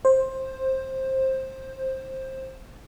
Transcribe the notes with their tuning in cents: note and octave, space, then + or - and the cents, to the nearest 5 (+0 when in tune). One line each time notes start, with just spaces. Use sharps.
C5 +15